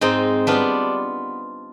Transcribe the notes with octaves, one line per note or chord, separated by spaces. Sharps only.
G#2 C4 D#4
G3 B3 D4 F4